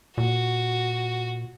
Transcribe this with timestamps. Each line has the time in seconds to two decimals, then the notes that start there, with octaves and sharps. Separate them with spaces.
0.18 A#2 F#4